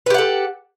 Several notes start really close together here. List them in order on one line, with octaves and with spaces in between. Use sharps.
B4 G4 F#5 A4